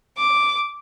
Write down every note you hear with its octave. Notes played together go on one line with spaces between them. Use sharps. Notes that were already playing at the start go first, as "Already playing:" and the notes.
D6